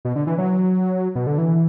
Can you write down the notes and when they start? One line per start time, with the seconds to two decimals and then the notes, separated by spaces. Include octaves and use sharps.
0.05 B2
0.16 D3
0.27 E3
0.38 F#3
1.15 B2
1.27 D3
1.38 E3